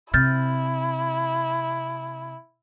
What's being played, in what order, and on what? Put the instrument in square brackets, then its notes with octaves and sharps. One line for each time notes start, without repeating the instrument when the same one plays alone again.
[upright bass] C3 [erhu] E4 [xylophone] F6 G6 A6